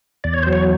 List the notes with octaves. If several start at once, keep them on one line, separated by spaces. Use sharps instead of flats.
E2 D5
C#5
F#3 C5
C#5